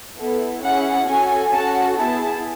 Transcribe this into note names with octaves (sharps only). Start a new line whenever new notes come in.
B3 E4 A4
C#4 E4 G#4 F#5
C#4 F#4 A4 G#5
C#4 F#4 A4 A5
B3 E4 G#4 A5